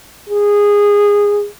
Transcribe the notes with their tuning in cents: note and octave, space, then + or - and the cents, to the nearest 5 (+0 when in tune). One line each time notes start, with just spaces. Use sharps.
G#4 -15